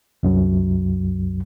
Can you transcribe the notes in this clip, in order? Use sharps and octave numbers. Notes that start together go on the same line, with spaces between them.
C2 F#2 F#3